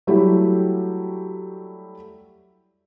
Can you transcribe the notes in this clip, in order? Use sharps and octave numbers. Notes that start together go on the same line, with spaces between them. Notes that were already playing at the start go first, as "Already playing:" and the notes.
F#3 G3 A3 E4 F#4 G4